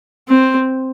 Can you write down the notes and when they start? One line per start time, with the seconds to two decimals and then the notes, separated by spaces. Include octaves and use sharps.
0.28 C4